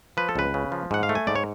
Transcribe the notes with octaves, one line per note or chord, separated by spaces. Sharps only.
F3 B4
A4
C#2 B4
C#3
F3
G#2 F#5
F5
A3
G#5
G#2 D5
C#5